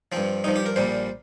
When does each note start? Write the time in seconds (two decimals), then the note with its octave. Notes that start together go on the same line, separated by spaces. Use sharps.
0.12 G2 F3 C4
0.44 G2 F3 D#4
0.56 G4
0.66 A#4
0.76 A#1 A#2 G3 C5